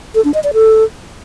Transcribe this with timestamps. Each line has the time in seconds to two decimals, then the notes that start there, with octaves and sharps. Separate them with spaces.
0.15 A4
0.25 D4
0.34 D#5
0.44 D5
0.53 A4